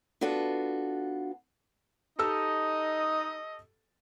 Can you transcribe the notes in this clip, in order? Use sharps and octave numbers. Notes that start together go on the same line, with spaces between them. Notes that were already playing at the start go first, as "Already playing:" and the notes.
B3 D4 F4 F#4 A4
D#4 G4 A4 D#5 E6